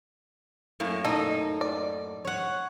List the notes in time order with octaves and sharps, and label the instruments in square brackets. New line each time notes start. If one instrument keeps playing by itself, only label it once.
[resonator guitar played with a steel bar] F#2 A2 A#3
[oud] D#4 [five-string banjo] A4
[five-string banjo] D5
[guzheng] C#5 F#5